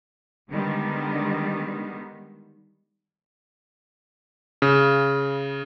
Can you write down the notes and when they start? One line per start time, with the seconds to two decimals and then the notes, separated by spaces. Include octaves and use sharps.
0.51 D3 D#3 G3 G#3 B3
4.62 C#3